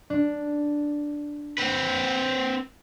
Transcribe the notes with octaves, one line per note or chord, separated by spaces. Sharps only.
D4
C4 B4